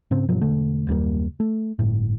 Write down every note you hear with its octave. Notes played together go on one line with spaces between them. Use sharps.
G#2 C#3 G#3 C4
G2 B2 F3 F#3
E1 D3 A3
F#1 D#2 G3 A#3
A3
G1 A2